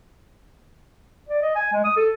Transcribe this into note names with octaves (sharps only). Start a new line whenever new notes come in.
D5
D#5
G#5
G#3
D#6
A4